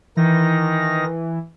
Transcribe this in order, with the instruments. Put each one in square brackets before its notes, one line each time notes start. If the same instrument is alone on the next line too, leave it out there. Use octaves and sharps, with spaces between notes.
[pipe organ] D#3 D#4 A#6 [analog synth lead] E3